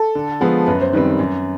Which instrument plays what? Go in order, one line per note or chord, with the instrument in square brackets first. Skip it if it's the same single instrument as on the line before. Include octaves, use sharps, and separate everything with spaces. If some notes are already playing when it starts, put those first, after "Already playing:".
Already playing: [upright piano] A4
[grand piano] D3
F3 G#3 B3
[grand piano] F#2 [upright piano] B4
[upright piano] C5
[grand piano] D#3 G3 C4 [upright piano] B4
[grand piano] F#2